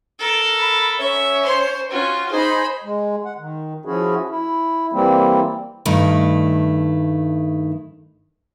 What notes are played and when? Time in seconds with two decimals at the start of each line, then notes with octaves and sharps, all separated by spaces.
0.19 A4 A#4
0.59 B5
0.98 C#4 C#5 E5
1.44 C5 C6
1.91 C#4 F4 F#4
2.31 D#4 G#4 C5 B5
2.84 G#3
3.25 F#5
3.38 D#3
3.85 F3 C#4 E4 F#4 G#4
4.30 E4
4.93 E3 G3 A#3 C4 E4
5.85 G2 D#3 A3 E4